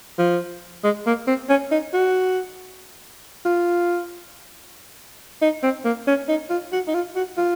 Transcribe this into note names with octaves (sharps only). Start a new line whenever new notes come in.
F3
G#3
A#3
C4
C#4
D#4
F#4
F4
D#4
C4
A#3
C#4
D#4
F4
F#4
D#4
F4
F#4
F4